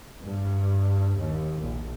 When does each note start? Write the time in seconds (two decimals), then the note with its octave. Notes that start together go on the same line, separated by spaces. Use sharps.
0.23 G2
1.17 D#2
1.61 A#1